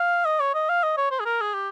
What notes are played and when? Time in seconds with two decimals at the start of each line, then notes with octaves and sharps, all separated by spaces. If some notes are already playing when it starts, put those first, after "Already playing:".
Already playing: F5
0.25 D#5
0.40 C#5
0.55 D#5
0.69 F5
0.83 D#5
0.98 C#5
1.11 C5
1.20 G#4
1.26 A#4
1.41 G#4
1.54 G4